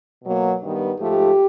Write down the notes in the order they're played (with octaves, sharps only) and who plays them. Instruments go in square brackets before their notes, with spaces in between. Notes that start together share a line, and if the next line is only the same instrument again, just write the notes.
[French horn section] B2 F#3 A#3
G2 D#3 G3 B3
G#2 F3 A3 G4